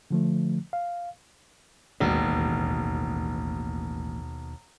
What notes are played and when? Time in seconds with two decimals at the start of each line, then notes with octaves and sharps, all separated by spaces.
0.11 D3 F3 A3
0.73 F5
2.00 E1 A1 D#2 B2 D#3 A#3